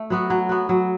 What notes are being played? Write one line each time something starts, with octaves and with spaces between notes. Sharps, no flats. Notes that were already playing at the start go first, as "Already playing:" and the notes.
Already playing: A3
F#3 B3 F#4
F#3
B3 F#4
F#3